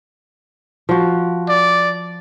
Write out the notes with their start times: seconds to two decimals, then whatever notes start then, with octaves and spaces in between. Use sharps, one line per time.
0.89 F3 F#4
1.49 D5